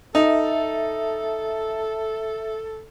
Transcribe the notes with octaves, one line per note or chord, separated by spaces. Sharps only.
D#4 A4 E5